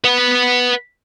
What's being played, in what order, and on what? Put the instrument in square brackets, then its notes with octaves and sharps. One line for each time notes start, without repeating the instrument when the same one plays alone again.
[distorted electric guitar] B4 F#5